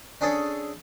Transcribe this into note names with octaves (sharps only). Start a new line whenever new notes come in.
C#4 D4 G#4 A4 C#5